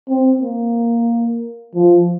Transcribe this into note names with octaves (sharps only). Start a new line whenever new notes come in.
C4
A#3
F3